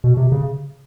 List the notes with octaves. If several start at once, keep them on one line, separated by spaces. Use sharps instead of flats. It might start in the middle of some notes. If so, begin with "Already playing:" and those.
B2
C3
C#3